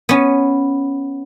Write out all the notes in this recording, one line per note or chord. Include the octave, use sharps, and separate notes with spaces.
B3 C#4